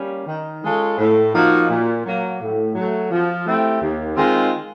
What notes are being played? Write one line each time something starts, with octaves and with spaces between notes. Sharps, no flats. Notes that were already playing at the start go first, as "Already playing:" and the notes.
Already playing: G3 A#3 C#4
D#3
G#3 C#4 F4 A4
A2
F3 A#3 D#4 F#4
A#2
F#3 A#3
A2
F#3 A3
F3
A3 C4 E4 G4
D#2
D#3 G#3 C4 F4